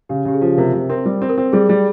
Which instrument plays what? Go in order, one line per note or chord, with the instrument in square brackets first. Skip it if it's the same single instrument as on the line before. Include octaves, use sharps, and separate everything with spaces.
[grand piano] C#3 [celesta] G4
[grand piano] C#3 [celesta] G4
[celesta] G#4
[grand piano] F3
[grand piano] C3 [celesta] A#4
[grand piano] C3 [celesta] C5
[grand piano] C4 [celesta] A#4
[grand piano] G3
C4
[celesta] A#4
[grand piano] C4
[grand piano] G3 [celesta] G#4
[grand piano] G3